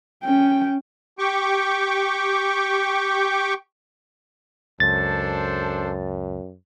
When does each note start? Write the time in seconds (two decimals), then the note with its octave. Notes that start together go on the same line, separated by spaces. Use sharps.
0.23 C#4 G5
1.19 G4 G5 C#6 D6
4.80 C#2 F#2 D4 A4 C5 A6